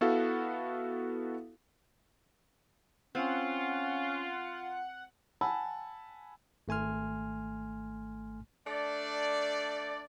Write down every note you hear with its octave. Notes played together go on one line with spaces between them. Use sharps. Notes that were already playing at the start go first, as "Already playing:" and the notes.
B3 E4 F#4 A4 F5
C4 C#4 F4 F#5
F#5 G#5 A5 B5 E6
G#1 A3 G#5 C6 F6
A3 D4 D5